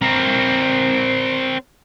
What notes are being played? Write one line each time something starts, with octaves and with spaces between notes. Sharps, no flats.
C4 A#4